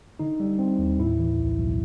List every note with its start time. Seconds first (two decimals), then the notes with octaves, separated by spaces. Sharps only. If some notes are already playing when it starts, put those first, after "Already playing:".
0.20 D3 D#4
0.40 G3
0.59 C4
0.79 D#2
0.99 A2 E4
1.18 E3
1.39 B1
1.59 B1